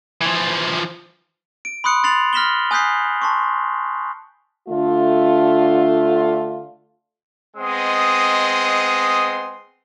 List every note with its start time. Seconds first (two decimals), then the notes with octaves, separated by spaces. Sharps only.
0.21 E3 F3
1.65 D7
1.84 B5 C6 D#6 F#6 C#7
2.04 C6 A6 C7 F7 F#7
2.33 F6 A#6 B6 E7 F#7 G7
2.71 G#5 D#6 F#6 G6 B6 C7
3.22 A5 C6 C#6
4.68 D3 A3 F4
7.57 G#3 B3 C4 D#5 C6 D#6